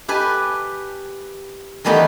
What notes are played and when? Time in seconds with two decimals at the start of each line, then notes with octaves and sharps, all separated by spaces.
0.08 G4 B4 G#5 A5
1.84 D#3 E3 G3 A3 B3 D#4